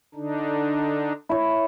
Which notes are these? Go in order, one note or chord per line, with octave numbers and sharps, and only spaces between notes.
D3 D4 D#4
E4 C#5